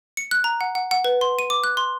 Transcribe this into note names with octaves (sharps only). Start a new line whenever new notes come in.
C#7
F#6
A#5
F#5
F#5
F#5
B4
C6
D#7
D6
F#6
C6